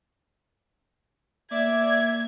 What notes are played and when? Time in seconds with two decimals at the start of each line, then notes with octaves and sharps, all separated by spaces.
1.52 A#3 D5 E5 G#6